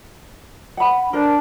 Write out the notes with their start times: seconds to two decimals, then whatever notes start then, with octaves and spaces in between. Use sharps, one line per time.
0.77 F#5 B5
1.13 D4 A#4 C5